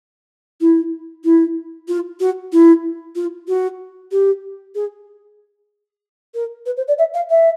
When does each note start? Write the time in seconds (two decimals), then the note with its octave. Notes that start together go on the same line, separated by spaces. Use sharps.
0.60 E4
1.24 E4
1.88 F4
2.20 F#4
2.52 E4
3.15 F4
3.48 F#4
4.11 G4
4.75 G#4
6.34 A#4
6.66 B4
6.77 C5
6.88 D5
6.98 E5
7.14 F5
7.30 E5